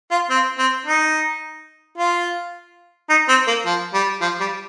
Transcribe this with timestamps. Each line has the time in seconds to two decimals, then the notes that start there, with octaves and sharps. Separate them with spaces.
0.11 F4
0.30 C4
0.58 C4
0.86 D#4
1.98 F4
3.10 D#4
3.29 C4
3.47 A#3
3.66 F3
3.94 G3
4.21 F3
4.40 G3